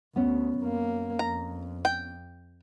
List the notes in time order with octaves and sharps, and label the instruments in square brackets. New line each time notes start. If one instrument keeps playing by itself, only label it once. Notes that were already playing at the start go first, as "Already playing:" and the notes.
[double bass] D2 [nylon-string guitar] B3 C#4
[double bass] F#2 A#3
[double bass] F2 [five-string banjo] A#5
[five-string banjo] G5